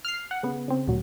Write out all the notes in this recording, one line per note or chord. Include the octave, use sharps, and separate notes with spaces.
F6 C7
F#5
C#3 B3
C#3 C4
D2 A#2 F#3